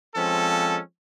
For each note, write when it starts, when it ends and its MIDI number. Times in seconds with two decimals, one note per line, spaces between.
0.15 0.79 53
0.15 0.79 56
0.15 0.79 60
0.15 0.79 61
0.15 0.79 69